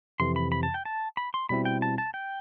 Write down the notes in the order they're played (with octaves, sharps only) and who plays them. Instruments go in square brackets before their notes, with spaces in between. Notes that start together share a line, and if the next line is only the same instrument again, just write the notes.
[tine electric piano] F2 C3 E3 [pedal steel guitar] C6
[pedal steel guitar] B5
B5
A5
G5
A5
B5
C6
[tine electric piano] B2 G3 C4 E4 [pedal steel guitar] B5
[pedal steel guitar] G5
A5
A5
G5